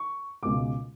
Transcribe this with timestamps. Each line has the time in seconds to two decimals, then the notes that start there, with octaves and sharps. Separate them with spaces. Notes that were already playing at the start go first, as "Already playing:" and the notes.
Already playing: C#6
0.43 C#2 B2 G#3 D6